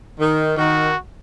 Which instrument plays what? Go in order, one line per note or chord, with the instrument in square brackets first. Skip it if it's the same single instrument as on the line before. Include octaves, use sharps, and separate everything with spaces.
[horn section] D#3
[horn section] D#3 [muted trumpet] F#4